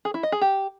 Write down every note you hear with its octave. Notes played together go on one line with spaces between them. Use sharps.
G#4
E4
D#5
G#4
G4